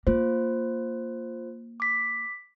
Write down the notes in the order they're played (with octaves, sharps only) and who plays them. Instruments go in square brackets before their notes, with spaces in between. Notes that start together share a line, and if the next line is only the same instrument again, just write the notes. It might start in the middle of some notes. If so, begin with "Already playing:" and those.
[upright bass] A#3 [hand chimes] F4 C5
[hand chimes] D6 B6